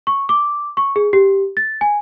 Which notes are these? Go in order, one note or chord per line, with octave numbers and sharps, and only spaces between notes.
C#6
D6
C#6
G#4
G4
A6
G#5